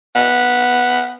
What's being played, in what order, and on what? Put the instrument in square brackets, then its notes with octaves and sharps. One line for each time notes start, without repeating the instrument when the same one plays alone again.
[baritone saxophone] B3